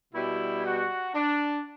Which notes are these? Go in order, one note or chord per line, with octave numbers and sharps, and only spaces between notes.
B2 G3 E4
F#4
D4